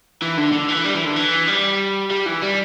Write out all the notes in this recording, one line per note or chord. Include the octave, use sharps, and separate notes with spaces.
E3
D3
D3
E3
G3
E3
D3
E3
G3
G3
E3
G3